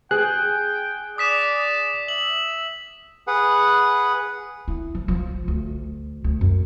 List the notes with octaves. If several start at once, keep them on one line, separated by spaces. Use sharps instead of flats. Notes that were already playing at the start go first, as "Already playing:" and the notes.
G#4 G5 F#6
D5 D#6 B6 E7
E5 F#7
G#4 B4 F#5
E4
F3
F3
D2
D2
F#2